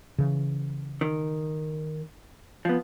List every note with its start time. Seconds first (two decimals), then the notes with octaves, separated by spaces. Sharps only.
0.18 C#3 E3
1.01 D#3
2.65 F3 B3